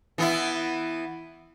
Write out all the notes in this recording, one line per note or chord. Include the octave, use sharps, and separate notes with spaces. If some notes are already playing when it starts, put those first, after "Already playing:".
E3 B3 E4